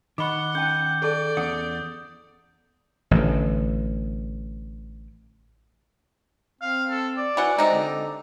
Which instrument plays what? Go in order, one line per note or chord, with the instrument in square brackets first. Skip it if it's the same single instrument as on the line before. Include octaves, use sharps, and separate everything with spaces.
[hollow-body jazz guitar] D#3 [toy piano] D#5 B5 C#6 [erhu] F#5 [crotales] D6 G7
[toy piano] C#4 G5 A5 [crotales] G6
[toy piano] G#4 A4 A5 [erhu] D5
[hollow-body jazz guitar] E2 C#4 F#5 [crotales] D#6
[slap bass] A1 D3
[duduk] C4 [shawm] F5
[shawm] A4
D5
[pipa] E3 F#5 [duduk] F#4
[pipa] C3 D#4 [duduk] G#3
[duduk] D3